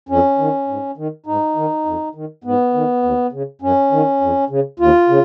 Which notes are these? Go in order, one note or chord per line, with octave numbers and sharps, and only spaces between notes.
F2 C#4
D#3
G#2
D#3
G#2 D#4
D#3
F2
D#3
G#2 B3
D#3
D#2
C#3
F#2 C#4
D#3
F2
C#3
D#2 F4
C#3